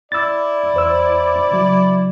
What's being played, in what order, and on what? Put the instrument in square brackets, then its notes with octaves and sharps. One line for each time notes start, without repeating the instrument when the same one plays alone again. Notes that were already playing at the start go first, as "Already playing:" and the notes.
[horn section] E4 D5 [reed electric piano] E6 A6
[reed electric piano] E2 C5 E6
C#3 F#3